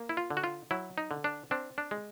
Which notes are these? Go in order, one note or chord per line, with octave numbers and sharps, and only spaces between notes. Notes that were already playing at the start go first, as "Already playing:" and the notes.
Already playing: A#3
E4
F4
D3
F#4
F4
F#3 E4
D#4
D3
D4
C4 D4
D4
G#3